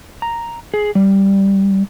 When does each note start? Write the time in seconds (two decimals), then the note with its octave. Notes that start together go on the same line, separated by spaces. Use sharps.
0.22 A#5
0.74 G#4
0.95 G3